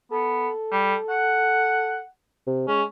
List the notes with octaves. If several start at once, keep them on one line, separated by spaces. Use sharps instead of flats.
B3 A4
G3
F#5
C3
G#3 C#4